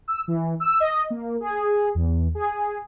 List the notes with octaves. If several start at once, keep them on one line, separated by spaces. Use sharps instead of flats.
E6
E3
E6
D#5
A#3
G#4
E2
G#4